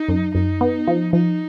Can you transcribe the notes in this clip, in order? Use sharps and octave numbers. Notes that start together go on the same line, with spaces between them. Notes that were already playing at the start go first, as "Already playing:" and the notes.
Already playing: D#4
F#2
F#2 D#4
B3
F3
F3 D#4